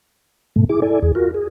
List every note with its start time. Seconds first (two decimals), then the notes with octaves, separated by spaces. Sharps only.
0.56 G#2 B2 A3
0.69 E4 G#4 D6
0.82 E4 A4 D5 G#5
1.02 E2 G#4
1.15 F4 F#4 A#4
1.34 G#4